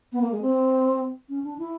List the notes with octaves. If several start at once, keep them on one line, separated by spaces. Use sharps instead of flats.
B3
A#3
G#3
C4
C#4
D4
E4